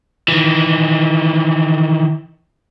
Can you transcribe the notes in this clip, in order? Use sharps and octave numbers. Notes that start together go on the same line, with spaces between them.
D#3 E3